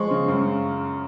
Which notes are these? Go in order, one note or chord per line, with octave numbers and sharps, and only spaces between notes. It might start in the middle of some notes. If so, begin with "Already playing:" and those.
Already playing: F3 G#3 C#6
C#3
F#2